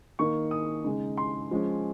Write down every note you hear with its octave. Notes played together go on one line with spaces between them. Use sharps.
D#3 A#3 D#4 C#6
D#6
C#3 G#3 D#4
C6
F3 G#3 C#4